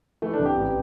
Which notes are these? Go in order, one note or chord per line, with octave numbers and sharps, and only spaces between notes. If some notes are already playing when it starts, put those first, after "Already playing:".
E3 A3
D4
C2
G4
A1